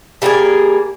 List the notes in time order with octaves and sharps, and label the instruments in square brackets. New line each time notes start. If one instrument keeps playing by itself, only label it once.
[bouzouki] G3 A#3 F4 G#4